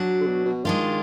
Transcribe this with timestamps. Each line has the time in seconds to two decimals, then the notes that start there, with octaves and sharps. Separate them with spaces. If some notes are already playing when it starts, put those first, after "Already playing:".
Already playing: F#3 D4 F#4
0.21 D3
0.26 B2
0.45 B2
0.65 D#3 G#3 D4 F4